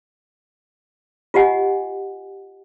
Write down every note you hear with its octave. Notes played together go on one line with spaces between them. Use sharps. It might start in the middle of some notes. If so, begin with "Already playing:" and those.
F4 G4 D#5 F#5 G#5